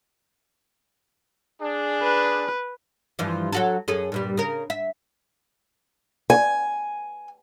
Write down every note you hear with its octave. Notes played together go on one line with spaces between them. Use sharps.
D4 G#4
B4
G2 E3 F3
F#3 F#4 A4
F#2 G#4 A4
G2 A#2 G3
C#3 A#4
E5
G#5